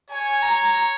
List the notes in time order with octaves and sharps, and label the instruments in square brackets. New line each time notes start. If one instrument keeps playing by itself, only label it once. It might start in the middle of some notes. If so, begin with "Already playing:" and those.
[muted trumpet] C#5 [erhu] G#5
[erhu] A#5